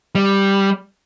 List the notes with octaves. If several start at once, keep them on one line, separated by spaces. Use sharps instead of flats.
G3